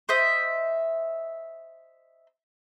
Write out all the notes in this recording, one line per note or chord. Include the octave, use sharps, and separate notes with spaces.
C5 D#5 E5